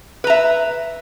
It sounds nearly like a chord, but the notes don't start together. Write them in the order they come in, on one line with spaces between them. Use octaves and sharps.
B4 A#5 E5